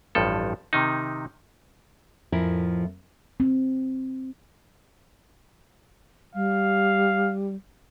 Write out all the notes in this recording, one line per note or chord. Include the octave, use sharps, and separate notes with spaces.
A1 G2 F3 A4
C3 D#3 D#4
F2 A2 F3 E4 A#4 G#5
C4
G3 F5